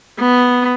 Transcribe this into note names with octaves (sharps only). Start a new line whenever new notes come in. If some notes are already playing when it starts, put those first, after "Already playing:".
B3